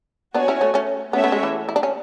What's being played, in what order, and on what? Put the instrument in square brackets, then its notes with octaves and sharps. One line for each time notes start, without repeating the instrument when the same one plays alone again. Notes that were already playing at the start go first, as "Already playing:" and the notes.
[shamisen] B3 D4 [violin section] F#4 C#5 G#5
[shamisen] C#4 E4
A3 C#4
A3 C#4
[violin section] A3 C#4 F#4 C#5 E5 [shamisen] B3
[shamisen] B3
G#3
E3
E4
D4
C#4